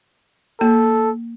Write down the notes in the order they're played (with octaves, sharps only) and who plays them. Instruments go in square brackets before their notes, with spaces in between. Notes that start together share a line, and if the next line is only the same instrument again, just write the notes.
[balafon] A#3 [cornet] A4